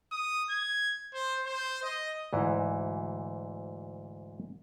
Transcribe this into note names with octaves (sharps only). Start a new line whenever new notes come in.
D#6
G#6
C5
C5
D#5
D2 G#2 E3